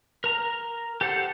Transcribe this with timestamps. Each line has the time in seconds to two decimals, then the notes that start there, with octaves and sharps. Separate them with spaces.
0.24 A#4 A#5
1.01 G4 A4 C5 F#5